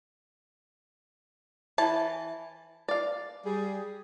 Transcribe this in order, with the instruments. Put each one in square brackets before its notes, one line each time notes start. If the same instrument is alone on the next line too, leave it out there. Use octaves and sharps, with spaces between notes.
[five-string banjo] E3 A5
D5 F5
[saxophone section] G3 G#4